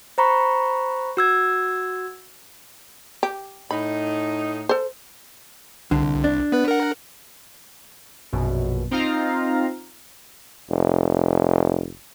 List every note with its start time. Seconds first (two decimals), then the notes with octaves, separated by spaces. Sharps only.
0.18 C5 A#5 B5 C#6
1.17 F#4 E6 G#6
3.23 G4
3.71 A2 D#4 B5
4.69 A4 C5
5.91 C2 D3
6.24 D4
6.52 B3 B4
6.68 A#4 F#5
8.33 A#1 F#2 B2
8.91 C4 D#4 F4 F5 A#5
10.70 F1